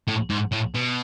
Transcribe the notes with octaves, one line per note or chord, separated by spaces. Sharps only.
A2
G#2
A2
B2